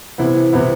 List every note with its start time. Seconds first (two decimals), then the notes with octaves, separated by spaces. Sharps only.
0.18 C3 E3 B3 E4
0.53 C3 E3 B3 E4